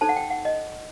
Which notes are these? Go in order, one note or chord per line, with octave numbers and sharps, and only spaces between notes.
D#4 A4 C5 A5
F#5
G5
F#5
D#5